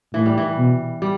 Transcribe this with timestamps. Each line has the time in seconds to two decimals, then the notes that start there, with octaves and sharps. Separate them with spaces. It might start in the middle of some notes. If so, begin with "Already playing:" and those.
0.14 A2 E3
0.26 G3
0.38 E3
0.58 B2
1.02 G3